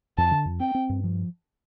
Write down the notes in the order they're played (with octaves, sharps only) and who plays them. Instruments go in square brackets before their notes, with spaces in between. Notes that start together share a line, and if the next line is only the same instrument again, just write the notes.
[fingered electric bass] F2 [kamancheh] A5
[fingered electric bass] D3
F2
[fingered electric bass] C4 [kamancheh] G5
[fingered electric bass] C4
G2
F3